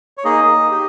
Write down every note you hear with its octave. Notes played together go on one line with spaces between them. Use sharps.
C#5
A#3 D#4 G#4 D#5
D#4 G4